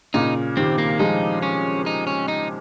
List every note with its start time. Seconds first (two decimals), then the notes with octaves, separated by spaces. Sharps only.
0.14 A#2 C#3 D#4
0.57 C3 D#3 C4
0.78 A#3
0.99 F3 G#3 D#4
1.43 C#4
1.86 D#4
2.07 C#4
2.28 D#4